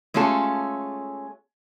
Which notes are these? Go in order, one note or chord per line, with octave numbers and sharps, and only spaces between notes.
G#3 A3 C#4 F4 A4